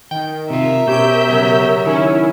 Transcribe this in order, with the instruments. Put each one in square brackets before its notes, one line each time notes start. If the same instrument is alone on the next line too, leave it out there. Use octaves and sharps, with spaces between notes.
[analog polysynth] D#3 [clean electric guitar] G5
[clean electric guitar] C3 F4 [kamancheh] A#4 E5
[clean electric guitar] B2 [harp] C#4 G4 C5 [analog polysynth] G6
[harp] F#2 C#3
[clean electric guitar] D#3 [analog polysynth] C#4 E4